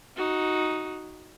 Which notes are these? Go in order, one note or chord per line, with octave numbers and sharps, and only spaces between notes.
D#4 F#4